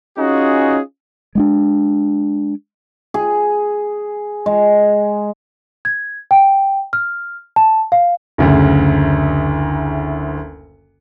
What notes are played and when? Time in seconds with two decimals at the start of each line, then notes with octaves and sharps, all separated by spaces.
0.18 C#4 D#4 F4 F#4 G#4
1.35 G#3 C#4 D4
3.14 G#4
4.46 G#3
5.85 G#6
6.31 G5
6.93 F6
7.56 A5
7.92 F5
8.38 F#1 D2 C#3